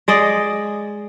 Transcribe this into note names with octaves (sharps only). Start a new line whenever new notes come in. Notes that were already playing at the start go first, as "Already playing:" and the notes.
G#3 D5 D#5